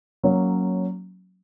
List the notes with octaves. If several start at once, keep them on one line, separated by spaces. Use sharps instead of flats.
F#3 A#3 C#4